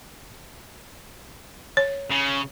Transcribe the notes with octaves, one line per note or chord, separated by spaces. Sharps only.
C#5
C#3